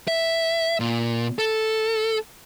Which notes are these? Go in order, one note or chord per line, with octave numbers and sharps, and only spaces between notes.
E5
A#2
A4